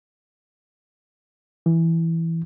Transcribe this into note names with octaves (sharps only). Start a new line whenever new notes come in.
E3